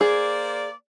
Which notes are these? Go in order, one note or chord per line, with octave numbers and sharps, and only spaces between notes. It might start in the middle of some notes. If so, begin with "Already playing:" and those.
A#3 G#4 C5 D5